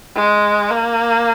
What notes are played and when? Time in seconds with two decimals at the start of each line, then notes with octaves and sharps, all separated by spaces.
0.16 G#3
0.70 A#3